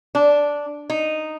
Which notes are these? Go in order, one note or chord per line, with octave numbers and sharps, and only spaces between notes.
D4
D#4